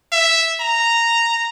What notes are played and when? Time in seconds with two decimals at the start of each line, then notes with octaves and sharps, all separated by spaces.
0.12 E5
0.60 A#5